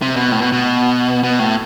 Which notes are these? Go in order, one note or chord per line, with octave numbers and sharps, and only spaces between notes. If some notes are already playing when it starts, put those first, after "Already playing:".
C3
B2
A2
B2
B2
B2
A2